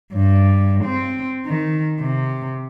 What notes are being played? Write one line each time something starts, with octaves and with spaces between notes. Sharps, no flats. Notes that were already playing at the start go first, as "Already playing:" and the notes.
G2
C4
D#3
C3